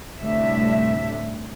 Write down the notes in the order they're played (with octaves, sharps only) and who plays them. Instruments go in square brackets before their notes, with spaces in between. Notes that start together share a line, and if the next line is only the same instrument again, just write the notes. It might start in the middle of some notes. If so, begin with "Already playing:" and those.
[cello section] D2 A2 C3 G3 D4 E5